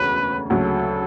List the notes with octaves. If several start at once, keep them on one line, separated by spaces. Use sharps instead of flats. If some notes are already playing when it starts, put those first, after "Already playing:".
Already playing: E1 D2 C#3 B4
D2 C#3 F#3 A4